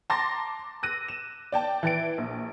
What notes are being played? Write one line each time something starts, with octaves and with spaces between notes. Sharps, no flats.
A5 A#5 C6 D6 A6 A#6
E6 F#6 A#6 D#7
E7
D5 G5 A5
E3 A6 D7
A#1